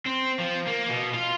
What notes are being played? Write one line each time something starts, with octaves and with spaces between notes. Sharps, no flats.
C4
F3
A#3
B2
F4